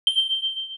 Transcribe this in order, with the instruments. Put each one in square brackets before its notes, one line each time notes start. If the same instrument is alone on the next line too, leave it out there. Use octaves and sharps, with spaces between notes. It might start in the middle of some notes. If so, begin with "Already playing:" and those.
[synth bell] G7